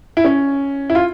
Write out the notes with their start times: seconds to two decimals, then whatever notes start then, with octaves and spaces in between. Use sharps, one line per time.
0.17 E4
0.25 C#4
0.90 E4
0.95 F4